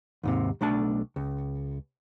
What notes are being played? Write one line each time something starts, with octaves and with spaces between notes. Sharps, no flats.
D#2 G#2 C3
B1 A3 D4 A5
C#2